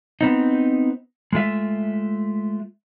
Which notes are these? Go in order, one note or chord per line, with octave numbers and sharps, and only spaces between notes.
B3 C4 D#4
G#3 A3 F4 E5